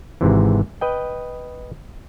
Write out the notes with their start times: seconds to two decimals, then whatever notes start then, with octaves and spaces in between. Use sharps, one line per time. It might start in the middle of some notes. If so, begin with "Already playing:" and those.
0.21 G#1 G#2 C3 E3
0.81 B4 D#5 G5